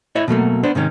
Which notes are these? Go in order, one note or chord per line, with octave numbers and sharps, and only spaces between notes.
E4 C#5 D#5 E5
B2 F#3 A3 A#3
B3 D4 C5
G#2 C3 D#3 C#4